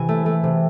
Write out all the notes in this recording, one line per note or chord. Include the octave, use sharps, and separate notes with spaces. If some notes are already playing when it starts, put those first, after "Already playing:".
Already playing: C3 E3 G#5 B5
A3
A3
C3